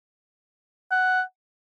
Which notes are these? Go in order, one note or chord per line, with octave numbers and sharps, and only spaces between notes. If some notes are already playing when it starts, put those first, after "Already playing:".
F#5